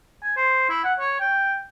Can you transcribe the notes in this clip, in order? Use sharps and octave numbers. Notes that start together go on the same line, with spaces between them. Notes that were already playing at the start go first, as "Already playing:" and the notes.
G#5
C5
E4
F#5
C#5
G5